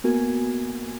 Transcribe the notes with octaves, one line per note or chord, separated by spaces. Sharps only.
A#3 B3 F#4 A#4 G#5 G#6